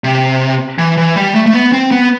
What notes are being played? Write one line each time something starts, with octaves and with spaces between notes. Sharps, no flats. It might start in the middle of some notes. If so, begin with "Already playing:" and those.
C3
E3
E3
G3
A3
A3
B3
C4
B3